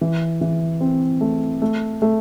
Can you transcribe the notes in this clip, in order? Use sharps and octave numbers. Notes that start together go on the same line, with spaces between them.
E3
E3
C4
A3
A3
A3